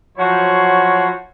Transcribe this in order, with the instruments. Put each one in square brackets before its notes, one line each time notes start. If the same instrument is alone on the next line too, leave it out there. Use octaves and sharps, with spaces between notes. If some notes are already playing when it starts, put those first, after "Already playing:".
[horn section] F3 F#3 E4 F#4 C5 C#5